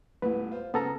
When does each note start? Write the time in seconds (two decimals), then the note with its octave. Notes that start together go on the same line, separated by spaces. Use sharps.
0.22 D#1 A2 B3 B4
0.52 F4 C5
0.74 C#3 B3 A4 A#5